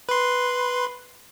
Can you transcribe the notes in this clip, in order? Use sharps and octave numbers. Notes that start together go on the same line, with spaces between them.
B4 C6